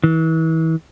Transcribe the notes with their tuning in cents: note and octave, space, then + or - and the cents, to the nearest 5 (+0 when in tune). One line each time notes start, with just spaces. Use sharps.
E3 -35